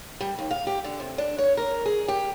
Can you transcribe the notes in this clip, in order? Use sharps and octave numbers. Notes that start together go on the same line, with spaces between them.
G3
D#2
F5
G4
D3
C3
D4
C#5
A#4
G#4
G4